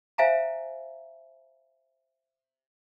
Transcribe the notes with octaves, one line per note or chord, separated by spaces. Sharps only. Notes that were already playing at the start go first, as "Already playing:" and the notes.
C5 E5 F5 G5 G#5 A#5